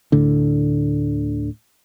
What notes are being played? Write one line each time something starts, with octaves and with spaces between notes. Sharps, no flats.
D2 A2 D3